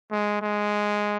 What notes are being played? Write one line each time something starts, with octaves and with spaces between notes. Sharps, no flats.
G#3
G#3